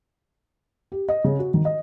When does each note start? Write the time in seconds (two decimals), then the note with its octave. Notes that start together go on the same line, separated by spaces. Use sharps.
0.92 G4
1.09 D#5
1.24 C#3
1.39 F#4
1.54 D#3
1.65 D#5